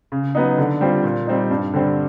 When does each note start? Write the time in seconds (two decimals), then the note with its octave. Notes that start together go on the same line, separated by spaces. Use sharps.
0.12 C#3
0.35 F#3 B3 D#4
0.58 D3
0.81 G3 C4 F4
1.04 A#2
1.27 G3 C4 D#4
1.51 G2
1.73 D3 G3 C4